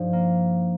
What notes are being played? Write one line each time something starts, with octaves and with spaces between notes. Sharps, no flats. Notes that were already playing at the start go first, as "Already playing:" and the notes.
Already playing: G2 F3 D#4
A#3